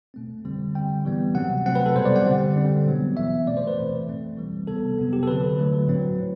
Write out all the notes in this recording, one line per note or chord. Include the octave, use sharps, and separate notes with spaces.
B2 A3 C4
D3 G3 C4
D3 G3 C4 G5
A2 E3 G3 B3
C3 F#3 C4 F#5
C3 F#3 A3 C4 F#5
B4
A4
B2 G3 B3 C5
D5
F#5
D3 G3 C4
D3 G3 C4
B2 F#3 B3
E3 B3 E5
B2 A3 C4 D5
C5
B4
A2 E3 A3 C4
B2 A3 C4
E3 G3 C4
C3 G3 B3 A4
C3 F#3 B3
G4
A4
D3 F#3 C4 B4
D3 F#3 A3
A2 F#3 C4
A2